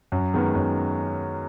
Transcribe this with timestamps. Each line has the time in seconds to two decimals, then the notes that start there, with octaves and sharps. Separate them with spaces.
0.12 F#2
0.34 D#3 G#3 B3
0.55 F#2